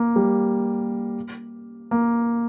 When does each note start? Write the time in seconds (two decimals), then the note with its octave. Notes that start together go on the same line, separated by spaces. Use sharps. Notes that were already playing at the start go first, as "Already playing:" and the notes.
Already playing: A#3
0.16 G3
1.91 A#3